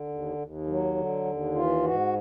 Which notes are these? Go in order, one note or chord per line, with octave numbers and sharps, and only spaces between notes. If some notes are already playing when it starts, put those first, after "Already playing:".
Already playing: D3
D#2
D#2
F#3
D3
D#2
E3 F4
G#2 F#4